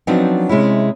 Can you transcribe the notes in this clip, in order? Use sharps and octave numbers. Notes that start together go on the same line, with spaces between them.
F3 F#3 B3 C4 D4 D#4
C3 G#3 C#4 E4